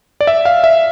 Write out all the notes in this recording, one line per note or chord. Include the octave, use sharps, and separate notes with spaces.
D5
E5
F5
E5